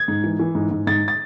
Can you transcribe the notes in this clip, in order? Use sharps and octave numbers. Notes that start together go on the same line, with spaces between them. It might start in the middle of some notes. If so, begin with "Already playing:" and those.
Already playing: G#6
G#2
E3
E3
G#2
G#2
G#2 A6
A6